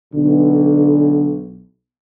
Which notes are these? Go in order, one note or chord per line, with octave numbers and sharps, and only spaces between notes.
B1 D3